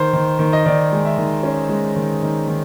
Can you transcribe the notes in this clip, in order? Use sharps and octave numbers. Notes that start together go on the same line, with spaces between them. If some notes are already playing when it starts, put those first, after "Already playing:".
Already playing: D#3 C5
D#3
D#3
D#5
D#3 D5
G#3
E5
D#3
C#4
G#3
D#3
D#3
D#3